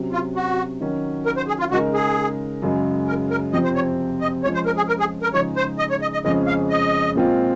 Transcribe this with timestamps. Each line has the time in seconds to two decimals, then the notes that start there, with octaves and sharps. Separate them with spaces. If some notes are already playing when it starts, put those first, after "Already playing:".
Already playing: C3 F#3 C#4
0.12 F4
0.36 F#4
0.81 D#3 F#3 C#4 F#4
1.26 A#4
1.37 C5
1.48 G#4
1.59 F4
1.71 C#3 G#3 D#4 F#4 A#4
1.94 G#4
2.62 F#2 C#3 G#3
3.07 A#4
3.30 A#4
3.53 F2 C3 F3 C4 D#5
3.64 C5
3.75 C#5
4.21 D#5
4.44 F3 G#3 C#4 C#5
4.54 C5
4.66 A#4
4.77 G#4
4.88 A#4
5.00 G#4
5.23 A#4
5.34 C#3 F3 G#3 D#4 C#5
5.56 C5
5.79 D#5
5.90 C#5
6.02 D#5
6.13 D#5
6.24 F2 C#3 G#3 C#4 G#4 D#5
6.47 F5
6.70 D#5
7.15 A#2 G#3 C4 F4